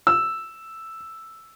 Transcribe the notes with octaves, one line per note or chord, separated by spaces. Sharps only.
E6